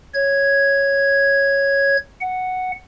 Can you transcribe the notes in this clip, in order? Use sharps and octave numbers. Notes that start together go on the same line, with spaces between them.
C#5 G#6
F#5